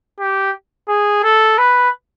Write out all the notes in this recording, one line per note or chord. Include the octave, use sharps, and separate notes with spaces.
G4
G#4
A4
B4